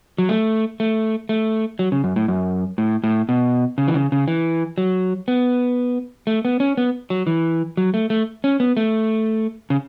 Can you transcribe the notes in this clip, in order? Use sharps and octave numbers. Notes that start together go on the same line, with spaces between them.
F#3
A3
A3
A3
F#3
C#3
F#2
A2
F#2
A2
A2
B2
C#3
E3
C#3
C#3
E3
F#3
B3
A3
B3
C#4
B3
F#3
E3
F#3
A3
A3
C#4
B3
A3
C#3